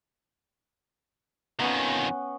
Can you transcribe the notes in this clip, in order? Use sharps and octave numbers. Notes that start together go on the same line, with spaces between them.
F2 D#3 B3 C#4